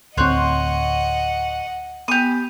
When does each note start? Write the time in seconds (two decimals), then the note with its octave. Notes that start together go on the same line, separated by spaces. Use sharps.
0.17 D1 D2 C4 C5 C#5 D#5 F#5 F#6
2.08 B3 G4 G#5 D#6